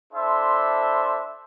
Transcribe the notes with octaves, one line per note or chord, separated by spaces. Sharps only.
D4 E4 A4 C5 E5 C6